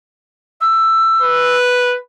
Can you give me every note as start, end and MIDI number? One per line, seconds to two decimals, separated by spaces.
0.61 1.56 88
1.22 1.97 71